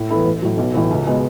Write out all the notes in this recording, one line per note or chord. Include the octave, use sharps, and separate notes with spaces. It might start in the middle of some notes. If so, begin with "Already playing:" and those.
Already playing: A2
E3 B3 E4 A4
A1
A2 F#3
B1
A2 E3
C#2
B2 G#3 B3